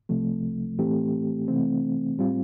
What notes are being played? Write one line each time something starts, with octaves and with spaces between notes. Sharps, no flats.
C2 C3 F3 A3
A2 E3 A3 C4 G4
C3 E3 A3 C4
A2 G3 C4 F4